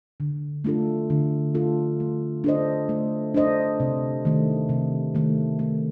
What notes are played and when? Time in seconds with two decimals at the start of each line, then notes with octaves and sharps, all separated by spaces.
0.20 D3
0.64 A3 D4 F4 A4
1.10 D3
1.55 A3 D4 F4 A4
2.00 A3
2.44 D4 A4 C5 D#5
2.89 A3
3.34 D4 A4 C5 D#5
3.80 C3
4.25 D#3 A3
4.69 C3
5.15 D#3 A3
5.59 A3